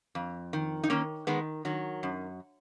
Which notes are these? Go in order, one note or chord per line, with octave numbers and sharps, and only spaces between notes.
F2
D#3
D#4
D#3 A#3 C#4
D#3 G#3 B3
D#3 F#3
F#2